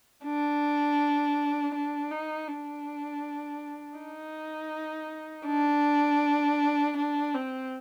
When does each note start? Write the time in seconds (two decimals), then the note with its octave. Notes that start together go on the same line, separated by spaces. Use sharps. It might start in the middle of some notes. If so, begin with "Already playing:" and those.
0.24 D4
1.74 D4
2.11 D#4
2.48 D4
3.98 D#4
5.47 D4
6.97 D4
7.34 C4